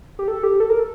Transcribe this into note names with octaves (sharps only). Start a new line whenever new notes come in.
G4
A4
G4
A4
A#4
A4